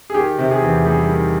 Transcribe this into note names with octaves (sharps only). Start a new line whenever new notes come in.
G#4
D#3 G4
C3
G#4
E2
G3 G#4
D#3